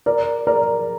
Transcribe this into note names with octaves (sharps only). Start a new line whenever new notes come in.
A#4 D5
A#4 D5